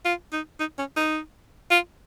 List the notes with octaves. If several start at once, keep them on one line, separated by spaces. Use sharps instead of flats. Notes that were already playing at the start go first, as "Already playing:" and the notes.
F4
D#4
D#4
C#4
D#4
F4